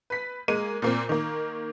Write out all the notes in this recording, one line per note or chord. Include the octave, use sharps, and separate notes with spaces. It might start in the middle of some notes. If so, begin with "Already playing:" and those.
B4 B6
G#3 A#3 D#7
A#2 A#3 C4
D#3 A#3